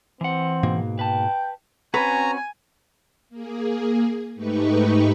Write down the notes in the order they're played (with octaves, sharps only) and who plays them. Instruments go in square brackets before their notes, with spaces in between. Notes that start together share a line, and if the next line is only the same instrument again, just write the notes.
[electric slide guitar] E3 F#5 [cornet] C4
[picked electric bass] G#2 B2 A#3
[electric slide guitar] B4 A5 [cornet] G5
[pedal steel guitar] C4 C#4 F#4 [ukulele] B4 [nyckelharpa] G#5 [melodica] A#5
[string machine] A#3 G#4
G#2 A3 D#4 G4 B4 C#6